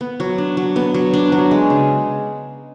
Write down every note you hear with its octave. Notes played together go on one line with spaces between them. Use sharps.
B3
F#3
D4
F#3
B3
F#3
D4
F#3
G#3
C#3